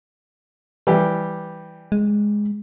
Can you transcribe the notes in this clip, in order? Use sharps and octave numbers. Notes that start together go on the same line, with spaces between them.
E3 G3 G4
G#3